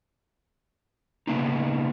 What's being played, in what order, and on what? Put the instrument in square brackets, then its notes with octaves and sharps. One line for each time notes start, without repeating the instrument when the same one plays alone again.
[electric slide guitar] C#3 A#3 B3 D#4